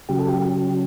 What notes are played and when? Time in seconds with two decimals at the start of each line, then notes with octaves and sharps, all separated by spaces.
0.09 C#3 F#3 G4
0.19 A4
0.29 G4